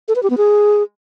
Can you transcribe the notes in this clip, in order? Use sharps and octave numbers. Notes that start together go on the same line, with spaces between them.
A4
B4
G4
B3
G#4